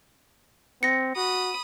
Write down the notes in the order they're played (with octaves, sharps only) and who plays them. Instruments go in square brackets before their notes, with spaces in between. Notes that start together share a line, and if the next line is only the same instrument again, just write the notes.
[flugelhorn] C4 [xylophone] A#6 C#7
[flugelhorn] F#4 [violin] B5 D#6